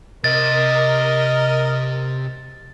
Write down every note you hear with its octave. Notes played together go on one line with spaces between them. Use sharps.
C3 A#4 D#5 A6